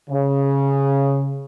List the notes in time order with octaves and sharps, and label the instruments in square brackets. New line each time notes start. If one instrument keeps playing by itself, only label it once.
[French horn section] C#3